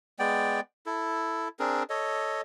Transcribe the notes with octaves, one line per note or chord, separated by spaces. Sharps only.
G#3 B3 D5 G5
E4 A4
C4 D4 G#4 A#4
A4 C#5 D#5